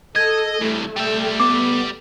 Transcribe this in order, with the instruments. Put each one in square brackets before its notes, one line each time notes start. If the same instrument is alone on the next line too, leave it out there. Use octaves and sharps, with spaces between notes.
[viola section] A4 [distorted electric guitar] D#5 [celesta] G#6
[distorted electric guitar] E3 G3 [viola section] A3
[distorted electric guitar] G3 E5 [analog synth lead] G5
[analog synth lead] B3 [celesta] D6